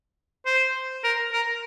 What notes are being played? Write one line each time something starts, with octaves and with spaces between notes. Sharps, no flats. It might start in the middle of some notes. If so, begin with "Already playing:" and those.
C5
A#4
A#4